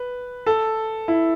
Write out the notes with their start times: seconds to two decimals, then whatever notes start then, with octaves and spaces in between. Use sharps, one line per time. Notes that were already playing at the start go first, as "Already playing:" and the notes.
Already playing: B4
0.46 A4
1.08 E4